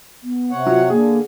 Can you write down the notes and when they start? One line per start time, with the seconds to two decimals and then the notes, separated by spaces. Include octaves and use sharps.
0.23 B3
0.51 C3 C#5 F#5
0.66 F#3 F4
0.90 D3 A#3 G#4